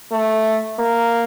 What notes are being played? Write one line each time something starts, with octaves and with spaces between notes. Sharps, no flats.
A3
A#3